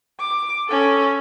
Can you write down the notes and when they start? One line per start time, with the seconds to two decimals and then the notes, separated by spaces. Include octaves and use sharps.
0.19 D6
0.68 C#4 A4